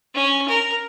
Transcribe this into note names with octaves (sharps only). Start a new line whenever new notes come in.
C#4
A#4